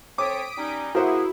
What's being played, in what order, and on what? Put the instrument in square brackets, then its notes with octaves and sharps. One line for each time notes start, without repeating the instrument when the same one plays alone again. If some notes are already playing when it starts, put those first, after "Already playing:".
[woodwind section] C4 A4 C#5 [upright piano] D6 [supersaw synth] D#6 B6 D7
[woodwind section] G3 C#4 D#4
[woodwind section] A#3 G#4 [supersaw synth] E4 [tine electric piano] F#4 [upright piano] A#4 C5 F#5